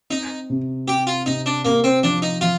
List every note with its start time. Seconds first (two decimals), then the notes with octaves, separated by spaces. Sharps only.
0.10 C4 D#4
0.50 C3
0.87 C4 G4
1.07 F4
1.26 C3 D#4
1.46 D4
1.65 C3 A#3
1.84 C4
2.03 F3 D4
2.22 D#4
2.41 F3 F4